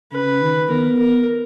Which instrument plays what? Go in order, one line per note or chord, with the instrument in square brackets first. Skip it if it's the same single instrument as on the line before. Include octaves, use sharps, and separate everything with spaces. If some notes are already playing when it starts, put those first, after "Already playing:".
[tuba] C#3 [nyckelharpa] B4
[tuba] D#3
[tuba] B3 [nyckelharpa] A#4
[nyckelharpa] A#4